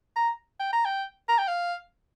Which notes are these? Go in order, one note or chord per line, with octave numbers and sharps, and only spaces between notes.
A#5
G5
A#5
G5
A#5
G5
F5